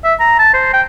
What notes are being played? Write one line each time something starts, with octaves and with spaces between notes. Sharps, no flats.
E5
A#5
A5
C5
G5